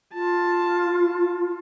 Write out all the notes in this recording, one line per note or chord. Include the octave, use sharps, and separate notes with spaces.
F4 A5